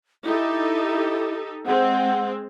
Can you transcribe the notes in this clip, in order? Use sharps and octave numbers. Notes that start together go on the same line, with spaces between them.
D#4 E4 G4 A4
G#3 C4 F#5